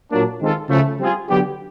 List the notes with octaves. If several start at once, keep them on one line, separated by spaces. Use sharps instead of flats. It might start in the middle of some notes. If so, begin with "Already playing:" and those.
A#2 F#3 A#3 D4
D#3 G#3 C4 F4 A4
C#3 F3 A3
G3 C4 F4 G#4
D3 F#3 B3 D4 G4